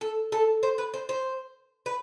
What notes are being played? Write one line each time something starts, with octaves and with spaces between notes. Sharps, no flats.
A4
A4
C5
B4
C5
C5
B4